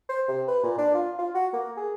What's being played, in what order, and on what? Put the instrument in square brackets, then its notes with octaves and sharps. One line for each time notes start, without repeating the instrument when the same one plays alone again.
[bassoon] C5
C3
B4
A#2
D4
F4
F4
F#4
A#3
G#4